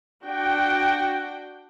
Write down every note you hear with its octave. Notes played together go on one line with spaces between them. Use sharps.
D4 F#4 G5